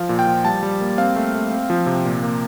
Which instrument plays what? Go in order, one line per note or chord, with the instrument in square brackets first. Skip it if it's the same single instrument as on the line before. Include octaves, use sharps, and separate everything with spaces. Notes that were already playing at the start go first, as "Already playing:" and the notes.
Already playing: [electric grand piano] F3 F5
A#2
G5
F3
G3 A5
G3
A#3
C4 F5
A3
A3
C4
F3
C3
A#2
A#3